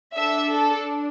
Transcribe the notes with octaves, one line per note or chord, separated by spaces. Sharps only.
D4 A4 E5
A4